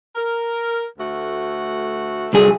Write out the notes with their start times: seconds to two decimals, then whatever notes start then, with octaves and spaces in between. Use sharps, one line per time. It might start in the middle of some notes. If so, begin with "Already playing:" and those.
0.15 A#4
0.98 D2 A3 F#4
2.33 C2 D3 F#3 G#4